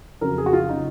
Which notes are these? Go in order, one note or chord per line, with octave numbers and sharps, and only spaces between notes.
F2 C#3 F#3 C#4 A#4
G#4
F#4
F4
C#3 F#3 C#4 D#4